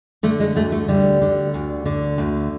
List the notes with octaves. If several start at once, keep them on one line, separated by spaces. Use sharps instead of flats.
D3 A3
G#3
D2 A3
A3
D3 G3
D3
D2
D3
D2